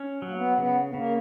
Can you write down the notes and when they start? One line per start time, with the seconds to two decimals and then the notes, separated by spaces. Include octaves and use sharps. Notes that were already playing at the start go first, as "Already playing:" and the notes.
Already playing: C#4
0.22 F#3
0.29 A#3
0.35 B3
0.58 C#3 B3
0.89 B3
0.94 C#3 A#3